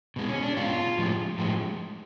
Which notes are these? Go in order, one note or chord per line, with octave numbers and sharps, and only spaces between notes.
B2 G#3
C#4
D4
B2 G#3 F4
A2 F3 G#3
A2 F3 G#3